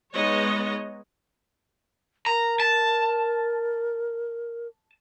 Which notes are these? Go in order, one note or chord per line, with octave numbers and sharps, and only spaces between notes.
G#3 B3 D#4 C#5 D#5
A#4 A#5
A5